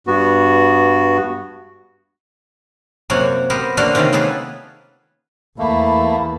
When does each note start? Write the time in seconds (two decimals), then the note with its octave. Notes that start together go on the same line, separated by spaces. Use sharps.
0.07 G2 B3 F#4
3.10 F#2 C3 A#3 C#5 F#5
3.50 B3 G4 A#4 C5
3.77 D3 A#3 D4 F#4 F5 C6
3.95 C3 D#3 C4 C#4 F4
4.12 A#3 B3 G#4 A4 B4
5.59 E2 A3 A#3 A5 B5